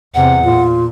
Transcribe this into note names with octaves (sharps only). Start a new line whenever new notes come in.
E2 C3 F#5
A#2 F4